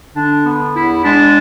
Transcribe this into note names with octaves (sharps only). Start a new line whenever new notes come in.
D3 D4
B3
E2 E4
G#3 D4